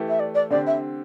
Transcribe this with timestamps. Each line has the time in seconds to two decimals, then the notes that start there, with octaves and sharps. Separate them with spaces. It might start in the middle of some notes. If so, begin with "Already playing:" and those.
Already playing: E3 A3 E4 G4
0.08 E5
0.19 D5
0.34 D5
0.50 D3 C4 G4 D5
0.66 E5